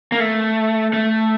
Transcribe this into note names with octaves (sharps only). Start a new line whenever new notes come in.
A#3
A3
A3